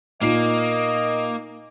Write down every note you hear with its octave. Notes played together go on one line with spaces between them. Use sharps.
A#2 A#3 D#4 D#5 C7